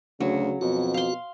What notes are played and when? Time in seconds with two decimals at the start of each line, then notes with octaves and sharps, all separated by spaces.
0.20 D2 C#3 F#3
0.61 F2 B2 F#4
0.94 F5 C6